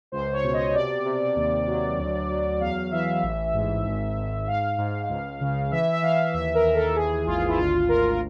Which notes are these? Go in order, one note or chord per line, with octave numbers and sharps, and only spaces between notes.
C#2 C5
C#5
B2
D#5
C3 D5
C3
D#2
F#3
D2
F#3
E2 F5
E3 E5
A1
G#2
G#1
G#1
G#2 F5
G#2
C#2
C#3
E3 E5
E5
E3 F5
D#2 E5
A#4
D#2
A4
E3 G#4
G#1 F4
E4
D2 F4
D2 A#4
A#4